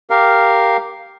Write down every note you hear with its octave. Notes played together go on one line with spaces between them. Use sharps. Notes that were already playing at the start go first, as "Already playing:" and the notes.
G4 A#4 F5